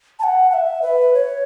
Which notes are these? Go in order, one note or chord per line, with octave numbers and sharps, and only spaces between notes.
A5
F#5
F#5
E5
B4
C#5